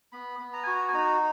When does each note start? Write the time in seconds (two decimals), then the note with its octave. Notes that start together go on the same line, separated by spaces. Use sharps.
0.12 B3 B5
0.40 B3
0.53 A#5
0.63 F#4 G#5
0.73 A#5
0.88 G#5
0.94 D#4 A#5